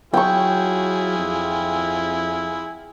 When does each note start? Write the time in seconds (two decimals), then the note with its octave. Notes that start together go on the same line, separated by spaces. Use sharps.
0.14 F#3 E4 F4 G#4 G5 C#6
1.19 F2